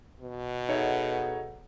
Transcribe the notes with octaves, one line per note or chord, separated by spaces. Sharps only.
B2
D#4 G#4 A4 C#5 E5 F#5